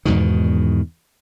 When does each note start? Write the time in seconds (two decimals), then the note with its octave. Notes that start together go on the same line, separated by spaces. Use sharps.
0.05 E2 G#2 B2 D#3